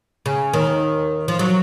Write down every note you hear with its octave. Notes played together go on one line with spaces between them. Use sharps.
C#3
D#2 D#3
F3
F#3